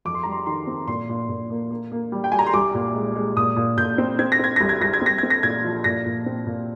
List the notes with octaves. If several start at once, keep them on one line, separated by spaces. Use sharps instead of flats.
F2 D6
C6
G3 A#5
C6
D#3 C6
C4
A#2 C6
A#2
A#2
A#3
A#3
A#3
G3
G5
G3 G#5
A#5
C6
C2 D6
A#2
G#3
G#3
A#2 D#6
A#2
A#2 G6
C4
C4 G#6
A#6
C4 G#6
C2 A#6
G#6
C2 A#6
G#6
C4 A#6
C4 G#6
A#6
A#2 G#6
F3
A#2 A#6
A#2
C4
A#2